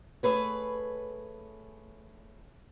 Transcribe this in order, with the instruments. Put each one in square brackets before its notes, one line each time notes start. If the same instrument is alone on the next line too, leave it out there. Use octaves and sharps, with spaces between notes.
[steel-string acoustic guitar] A3 G#4 B4 C#5